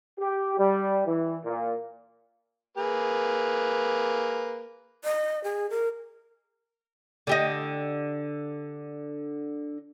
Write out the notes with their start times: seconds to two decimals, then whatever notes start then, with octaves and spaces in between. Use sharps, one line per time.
0.18 G4
0.57 G3
1.05 E3
1.44 A#2
2.77 A#3 G#4 B4
5.04 D#5
5.44 G#4
5.70 A#4
7.27 D3 G4 D#5